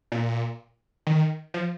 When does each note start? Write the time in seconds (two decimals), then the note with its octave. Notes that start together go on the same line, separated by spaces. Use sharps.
0.12 A#2
1.07 D#3
1.54 F3